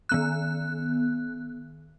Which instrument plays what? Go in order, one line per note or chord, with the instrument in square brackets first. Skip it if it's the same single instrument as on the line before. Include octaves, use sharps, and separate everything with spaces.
[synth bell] D#3 B3 F#6